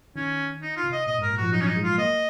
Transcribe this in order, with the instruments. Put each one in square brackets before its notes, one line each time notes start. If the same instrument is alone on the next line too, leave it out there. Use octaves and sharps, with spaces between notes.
[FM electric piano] D#3 [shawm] C#4
[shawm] D#4
F4
[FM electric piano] C3
[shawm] D#5
[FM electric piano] A#2 [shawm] D#5
[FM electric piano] G#2
[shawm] A#4
[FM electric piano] A#2
[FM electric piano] F3 [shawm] F#4
[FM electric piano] F#3 [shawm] D#4
[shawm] C#4
D#4
[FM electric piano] G#3
[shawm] F4
[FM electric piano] A#3 [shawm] D#5